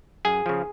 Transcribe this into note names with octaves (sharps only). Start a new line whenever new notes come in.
F#2 G#4 G#5
C#3 F3